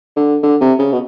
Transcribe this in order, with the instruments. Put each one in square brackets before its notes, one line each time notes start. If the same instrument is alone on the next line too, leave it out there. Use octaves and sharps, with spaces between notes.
[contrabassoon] D3
D3
C3
C#3
B2